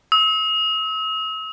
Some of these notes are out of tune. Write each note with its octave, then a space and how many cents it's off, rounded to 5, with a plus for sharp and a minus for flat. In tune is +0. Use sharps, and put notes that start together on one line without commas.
E6 -45